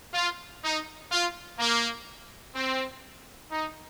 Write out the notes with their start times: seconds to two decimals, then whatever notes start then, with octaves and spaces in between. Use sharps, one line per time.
0.13 F4
0.63 D#4
1.11 F4
1.59 A#3
2.55 C4
3.51 D#4